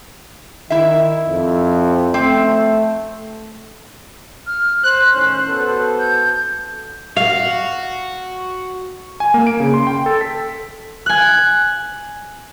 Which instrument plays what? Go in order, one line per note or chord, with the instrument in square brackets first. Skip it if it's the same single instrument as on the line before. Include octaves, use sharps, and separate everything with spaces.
[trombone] D#3 [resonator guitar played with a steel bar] E4 E5
[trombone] F2
[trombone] A3 [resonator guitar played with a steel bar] C4
[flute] F6
[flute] C5 [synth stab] F#6
[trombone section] A2 D#3 C#4
B3 F#4 A4
[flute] G6
[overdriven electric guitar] F#4 [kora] F5
[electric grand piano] G#5
A#3
D7
C#3
C6
G5
A4
B6
[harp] G#5 F#6